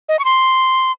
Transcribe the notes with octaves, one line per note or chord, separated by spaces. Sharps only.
D#5
C#6
C6